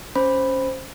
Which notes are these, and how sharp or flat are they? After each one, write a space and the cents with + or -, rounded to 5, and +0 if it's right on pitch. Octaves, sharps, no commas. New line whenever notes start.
C#4 +0 C5 +0 B5 +0